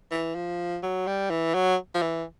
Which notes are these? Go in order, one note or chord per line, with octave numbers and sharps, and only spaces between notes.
E3
F3
F#3
G3
E3
F#3
F3
E3